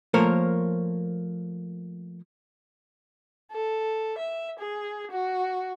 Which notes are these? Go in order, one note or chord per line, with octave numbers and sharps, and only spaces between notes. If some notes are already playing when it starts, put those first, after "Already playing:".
F3 A3 A#3 A#4 C5 C#5
A4
E5
G#4
F#4